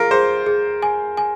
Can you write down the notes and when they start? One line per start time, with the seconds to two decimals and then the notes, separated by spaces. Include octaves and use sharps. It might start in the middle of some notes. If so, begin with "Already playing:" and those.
Already playing: F4 G#4 A#4
0.11 G#4 C5
0.47 G#4
0.83 G#5
1.17 G#5